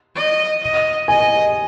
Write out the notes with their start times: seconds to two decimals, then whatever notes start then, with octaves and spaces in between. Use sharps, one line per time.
0.15 D#5
0.62 D#5
1.08 D#5 G#5